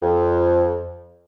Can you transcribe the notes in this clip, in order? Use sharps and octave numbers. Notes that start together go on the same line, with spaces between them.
F2